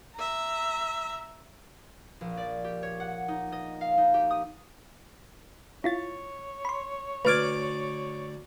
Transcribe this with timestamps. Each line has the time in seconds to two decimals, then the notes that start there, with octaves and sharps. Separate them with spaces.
0.16 E5 A#5
2.21 A#1
2.37 D5
2.64 G4
2.83 C#5
3.00 F#5
3.28 D#4
3.52 D#5
3.81 F5
3.98 D#4
4.14 G4
4.31 D#6
5.84 E4 F4 C#5 A6
6.65 B5 C6
7.25 D2 B4 D5 D6 F6 G#6